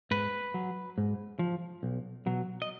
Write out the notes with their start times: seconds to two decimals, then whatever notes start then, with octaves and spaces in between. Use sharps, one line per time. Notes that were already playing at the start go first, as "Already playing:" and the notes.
0.11 G#2 B4
0.54 F#3
0.98 G#2
1.39 F3
1.83 B1
2.26 B2 F#3
2.62 D#5